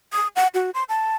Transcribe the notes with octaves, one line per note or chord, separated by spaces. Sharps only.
D#6
F#5
F#4
C6
A5